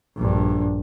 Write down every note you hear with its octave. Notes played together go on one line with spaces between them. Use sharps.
A#1 G2